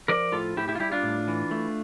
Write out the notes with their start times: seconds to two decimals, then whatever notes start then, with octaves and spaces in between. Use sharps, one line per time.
0.08 F3 A#4 D5
0.32 A2 F4 A4
0.56 A2 E4 G4
0.68 E4 G4
0.75 F4
0.80 G3 E4 G4
0.92 D4 F4
1.03 A2
1.28 E3
1.51 A3